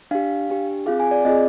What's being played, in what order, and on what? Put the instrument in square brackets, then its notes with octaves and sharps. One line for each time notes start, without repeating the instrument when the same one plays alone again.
[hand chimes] D4 G4 F5
D4 G4
C4 F4 G#4 F5
G#5
D5
C4 F4 G#4 D#5